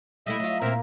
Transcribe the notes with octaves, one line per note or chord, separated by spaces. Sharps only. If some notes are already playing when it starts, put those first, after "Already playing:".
G3 A3 E4 D#5 E5
F#3 F4
A#2 A#3 C4 A#4 E5